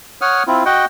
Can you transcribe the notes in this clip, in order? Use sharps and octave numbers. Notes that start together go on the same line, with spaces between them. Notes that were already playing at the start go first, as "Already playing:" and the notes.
C#5 F#5 D#6 F6
C4 E4 F4
F#4 D#5 F#5 G5